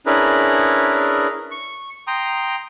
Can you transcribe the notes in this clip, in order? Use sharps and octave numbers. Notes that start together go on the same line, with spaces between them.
C#4 D4 E4 G#4 A#4 B4
C#6
G5 A#5 C6 D#6